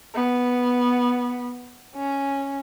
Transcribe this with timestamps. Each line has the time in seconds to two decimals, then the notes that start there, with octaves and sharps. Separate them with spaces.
0.15 B3
1.96 C#4